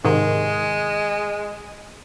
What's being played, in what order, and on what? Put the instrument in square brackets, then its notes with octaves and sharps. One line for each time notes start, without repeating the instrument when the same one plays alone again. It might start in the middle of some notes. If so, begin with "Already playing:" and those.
[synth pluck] G#2 C3 D#3 [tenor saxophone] G#3